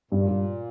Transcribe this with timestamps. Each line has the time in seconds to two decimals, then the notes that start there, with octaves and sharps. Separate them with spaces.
0.11 G2 A#2
0.28 G2